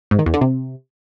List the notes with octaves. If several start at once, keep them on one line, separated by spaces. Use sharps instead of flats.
G#2
D#3
E2
D3
C3